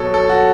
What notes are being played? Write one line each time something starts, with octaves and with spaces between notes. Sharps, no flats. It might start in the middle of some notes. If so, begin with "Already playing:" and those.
Already playing: B2 F#3 A4 C#5
A4
F#4